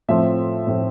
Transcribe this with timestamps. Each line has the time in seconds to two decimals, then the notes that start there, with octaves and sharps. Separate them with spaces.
0.08 A2 F3 A3 C4 E5
0.67 A2 F3 A3 C4